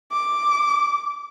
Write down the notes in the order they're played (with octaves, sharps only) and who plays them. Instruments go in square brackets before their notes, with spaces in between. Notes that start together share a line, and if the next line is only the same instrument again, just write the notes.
[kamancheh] D6